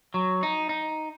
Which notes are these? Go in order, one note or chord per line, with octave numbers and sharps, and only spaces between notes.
F#3
D#4
D#4